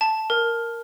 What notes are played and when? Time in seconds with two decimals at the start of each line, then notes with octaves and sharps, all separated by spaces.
0.01 A5
0.30 A#4